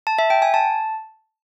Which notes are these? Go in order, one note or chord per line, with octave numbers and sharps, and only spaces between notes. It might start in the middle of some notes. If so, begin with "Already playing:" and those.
A5
E5
G5
G#5
A5